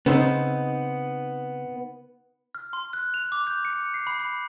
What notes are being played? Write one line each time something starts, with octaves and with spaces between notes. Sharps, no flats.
C#3 B3 C4 D#4
F6
C6
F#6
F7
D6
G6
C#7
C7
B5
B5